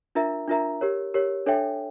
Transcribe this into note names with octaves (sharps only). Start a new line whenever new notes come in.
D4 F4 A#4 E5 A#5
D4 F4 A#4 E5 A#5
G4 A#4 C#5
G4 A#4 C#5
D4 A4 C#5 E5 G5